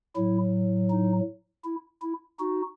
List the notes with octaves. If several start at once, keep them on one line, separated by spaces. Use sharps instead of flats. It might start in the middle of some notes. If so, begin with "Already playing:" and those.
A2 F#3 E4
D#4
E4
E4
D#4 F#4